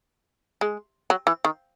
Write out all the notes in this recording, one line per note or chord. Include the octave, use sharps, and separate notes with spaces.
G#3
F#3
E3
D#3